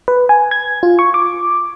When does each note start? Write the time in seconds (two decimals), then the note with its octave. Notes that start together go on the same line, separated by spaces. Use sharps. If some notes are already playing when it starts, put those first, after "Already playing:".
0.08 B4
0.29 G#5
0.51 G#6
0.83 F4
0.99 C#6
1.14 D6